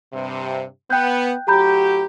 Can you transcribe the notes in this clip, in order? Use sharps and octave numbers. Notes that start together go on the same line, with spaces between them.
G2 C3
B3 G5 F#6 G6
A2 F#3 G4 A#5 B5 G6